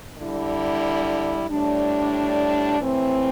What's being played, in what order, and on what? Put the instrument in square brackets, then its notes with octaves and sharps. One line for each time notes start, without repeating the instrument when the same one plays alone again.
[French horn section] D3 G3 E4
A2 G3 D4
A2 E3 C4